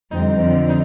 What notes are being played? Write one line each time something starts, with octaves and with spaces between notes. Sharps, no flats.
F2 D3 G3 C4 D#4
F2 D3 F3
D#4